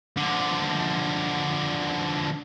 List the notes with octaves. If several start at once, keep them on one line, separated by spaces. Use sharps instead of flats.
D3 F3